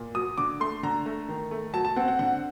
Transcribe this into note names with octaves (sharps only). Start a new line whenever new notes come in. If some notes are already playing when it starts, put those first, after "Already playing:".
Already playing: A#2
F#3 D#6
D3 D6
A3 C6
D3 A#5
A3
D#3
A3
F#3 A5
A5
C4 F#5
F#5
D3 F#5